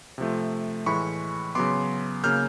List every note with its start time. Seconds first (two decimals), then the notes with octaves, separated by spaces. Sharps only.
0.18 C3 F3 A3
0.86 A2 E3 G#3 B5 C#6
1.55 C#3 F#3 B3 C6 D6
2.23 C#3 F#3 A#3 F6 G6